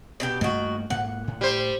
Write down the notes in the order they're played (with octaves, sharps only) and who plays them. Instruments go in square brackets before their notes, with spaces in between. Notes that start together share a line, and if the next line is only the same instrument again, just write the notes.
[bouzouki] B2 D4 G4
[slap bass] G2 A3 A#3 [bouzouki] D#3 F#4
[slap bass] G#2 A#3 [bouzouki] F#5
[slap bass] A2
[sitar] G3 C5